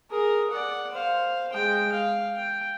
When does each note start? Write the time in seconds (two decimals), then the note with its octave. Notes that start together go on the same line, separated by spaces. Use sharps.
0.10 G#4 A#4
0.51 D5 F#5
0.93 C5 F5
1.52 G#3 G5
1.92 F5
2.35 G5